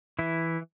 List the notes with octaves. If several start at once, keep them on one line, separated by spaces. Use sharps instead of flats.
E3 E4